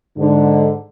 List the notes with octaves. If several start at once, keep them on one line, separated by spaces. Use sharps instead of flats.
G#2 D3